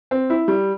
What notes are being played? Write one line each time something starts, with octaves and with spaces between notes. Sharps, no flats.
C4
E4
G3